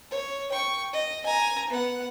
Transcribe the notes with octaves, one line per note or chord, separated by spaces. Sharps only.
C#5
G5 C#6
D#5
G#5 A#5
B3 F#5